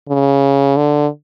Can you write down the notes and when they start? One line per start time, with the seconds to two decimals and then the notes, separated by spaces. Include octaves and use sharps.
0.09 C#3
0.77 D3